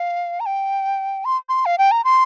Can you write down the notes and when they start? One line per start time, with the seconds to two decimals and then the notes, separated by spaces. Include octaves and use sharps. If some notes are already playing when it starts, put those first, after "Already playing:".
Already playing: F5
0.40 A#5
0.46 G5
1.25 C6
1.49 C6
1.66 F5
1.78 G5
1.91 A#5
2.04 C6